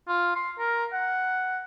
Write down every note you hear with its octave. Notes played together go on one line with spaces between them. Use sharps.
F4
C6
A#4
F#5